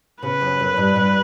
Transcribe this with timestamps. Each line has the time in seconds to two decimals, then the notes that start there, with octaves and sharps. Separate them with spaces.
0.22 C#3 B4
0.41 F#2
0.60 F#2
0.77 G2
0.96 G2